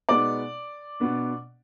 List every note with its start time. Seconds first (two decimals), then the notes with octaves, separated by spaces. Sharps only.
0.09 B2 G#3 B3 D#4 D5 D6
1.00 B2 B3 D4